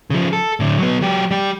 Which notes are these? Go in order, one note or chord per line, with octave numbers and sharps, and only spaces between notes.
C#3 F3
A4
A2 D3
F#3 B3
F#3 G4
G3 G4